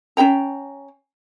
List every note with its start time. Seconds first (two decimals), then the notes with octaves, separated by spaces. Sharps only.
0.17 C#4 A#4 G5 A#5